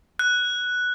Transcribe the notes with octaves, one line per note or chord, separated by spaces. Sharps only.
F#6